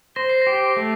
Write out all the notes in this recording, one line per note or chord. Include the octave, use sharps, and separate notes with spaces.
C5 A#6
C7
A#6
G4
A3